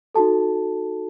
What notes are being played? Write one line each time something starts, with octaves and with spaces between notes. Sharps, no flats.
D#4 F#4 A4 A5